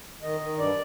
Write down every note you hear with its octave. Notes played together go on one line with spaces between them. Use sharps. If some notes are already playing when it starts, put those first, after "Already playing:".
D#3 D#5
D#3
G2 D5